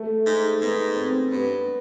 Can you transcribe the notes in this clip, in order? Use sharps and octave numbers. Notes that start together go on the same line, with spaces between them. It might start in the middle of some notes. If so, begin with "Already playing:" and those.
Already playing: A3
G#2
G#2 B3
C4
G2 B3